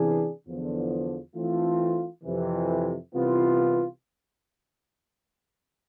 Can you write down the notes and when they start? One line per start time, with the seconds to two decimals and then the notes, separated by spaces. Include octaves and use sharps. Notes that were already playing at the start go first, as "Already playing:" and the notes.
Already playing: C3 E3 B3 D4 G#4
0.47 E2 D3 F3
1.36 E3 A3 C4 F4
2.24 F2 C3 E3
3.13 C2 C3 E3 B3 F4